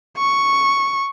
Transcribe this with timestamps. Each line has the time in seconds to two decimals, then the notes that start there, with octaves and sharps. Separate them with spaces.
0.18 C#6